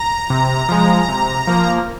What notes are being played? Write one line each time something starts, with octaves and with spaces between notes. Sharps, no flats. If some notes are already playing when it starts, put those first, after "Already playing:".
Already playing: A#5
C3
F3 G#3
C3
F3 A#3